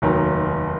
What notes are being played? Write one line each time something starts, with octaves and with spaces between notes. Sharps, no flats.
F1 D#2 D#3 F#3